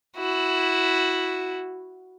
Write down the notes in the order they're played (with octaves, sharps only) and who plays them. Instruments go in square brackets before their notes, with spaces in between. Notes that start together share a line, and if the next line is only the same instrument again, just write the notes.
[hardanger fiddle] E4 F#4